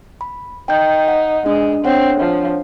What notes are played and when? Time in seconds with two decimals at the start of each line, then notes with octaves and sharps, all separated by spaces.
0.21 B5
0.68 D#4 G5 G6
1.08 F#5
1.46 G#3 D4
1.85 C4 D4 C#5 F#5
2.20 F3